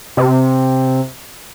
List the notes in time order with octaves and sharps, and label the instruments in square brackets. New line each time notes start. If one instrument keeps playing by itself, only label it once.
[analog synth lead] C3